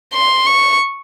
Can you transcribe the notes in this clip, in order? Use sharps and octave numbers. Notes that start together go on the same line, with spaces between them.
C6
C#6